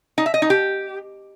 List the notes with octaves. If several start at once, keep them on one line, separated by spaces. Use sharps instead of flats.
D#4
E5
D#5
D#4
G4